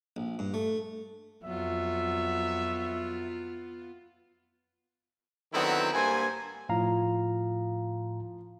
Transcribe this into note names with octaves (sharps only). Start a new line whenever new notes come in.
A#1
G2
A3
F2 F#3 B3 F4 E5
D3 D#3 F#3 B3 C4 E4
G2 A#3 A#4 C5 G#5
A2 F3 F5 A#5